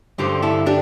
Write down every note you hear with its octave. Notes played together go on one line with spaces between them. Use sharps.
G2 D3 G4 C5
E4 A4
D4 G4